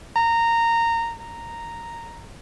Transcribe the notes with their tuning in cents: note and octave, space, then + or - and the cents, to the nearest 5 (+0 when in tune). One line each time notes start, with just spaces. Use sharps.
A#5 -15
A#5 -5